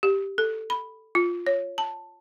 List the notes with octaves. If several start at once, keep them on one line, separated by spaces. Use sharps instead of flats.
G4
A4
B5
F4
C#5
A5